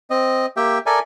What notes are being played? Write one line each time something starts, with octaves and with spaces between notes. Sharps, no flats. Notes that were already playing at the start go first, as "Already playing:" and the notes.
C4 D#5
A#3 G4 E5 G5
A4 A#4 D5 E5 G#5